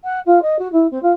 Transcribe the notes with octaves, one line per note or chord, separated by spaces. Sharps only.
F#5
F4
D#5
F#4
E4
C4
F4